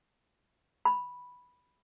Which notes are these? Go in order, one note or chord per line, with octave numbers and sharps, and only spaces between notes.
B5